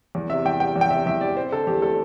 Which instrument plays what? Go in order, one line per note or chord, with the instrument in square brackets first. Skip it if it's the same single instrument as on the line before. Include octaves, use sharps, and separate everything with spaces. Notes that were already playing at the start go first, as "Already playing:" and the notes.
[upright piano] E2
C3 E5
E2 G5
G3 G5
E2
G5
C3 E5
E2 E5
G3 D5
C4 C5
D3 A4
E2 G4
A3 A4